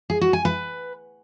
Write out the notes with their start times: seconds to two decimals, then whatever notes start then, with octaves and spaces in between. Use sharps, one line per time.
0.10 G#4
0.21 F#4
0.33 G#5
0.45 B4